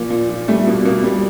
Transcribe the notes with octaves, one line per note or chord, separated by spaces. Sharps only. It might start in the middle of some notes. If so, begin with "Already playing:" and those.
Already playing: A#2 F3 A#3
A#2
F3
G3 A3
B2 A#3
B2 A#3
G3